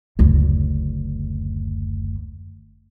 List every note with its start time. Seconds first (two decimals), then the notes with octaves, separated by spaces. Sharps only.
0.19 F#1 D2